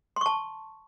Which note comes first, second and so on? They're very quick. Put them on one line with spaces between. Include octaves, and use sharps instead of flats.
C6 C#6 A5